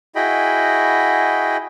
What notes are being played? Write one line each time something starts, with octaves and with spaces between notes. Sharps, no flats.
E4 F#4 G#4 D#5 G5 B5